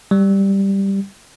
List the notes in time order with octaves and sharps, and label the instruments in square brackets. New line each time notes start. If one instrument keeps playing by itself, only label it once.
[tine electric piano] G3